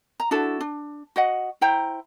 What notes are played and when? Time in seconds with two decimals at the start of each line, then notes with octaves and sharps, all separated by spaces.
0.20 A#5
0.31 D4 E4 F#4 A4
0.61 D4
1.16 F#4 D#5 F#5
1.61 E4 C5 G5 A#5